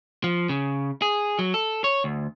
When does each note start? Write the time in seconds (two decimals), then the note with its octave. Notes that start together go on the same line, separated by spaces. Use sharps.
0.24 F3
0.49 C#3
1.02 G#4
1.39 F#3
1.54 A4
1.84 C#5
2.04 D2